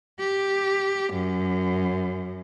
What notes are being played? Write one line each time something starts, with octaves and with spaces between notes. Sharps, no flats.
G4
F#2